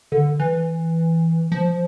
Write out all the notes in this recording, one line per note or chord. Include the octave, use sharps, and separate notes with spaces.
D3
E3
F3